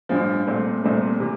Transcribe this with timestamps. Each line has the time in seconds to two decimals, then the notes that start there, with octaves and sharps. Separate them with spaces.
0.09 A1 G2 F3
0.47 C2 A#2 A3 C4
0.83 C2 A#2 A3 C4
1.20 C3 E3